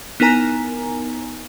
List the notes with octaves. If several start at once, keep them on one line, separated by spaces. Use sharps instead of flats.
B3 D#4 E4 A#4 G#5 A#5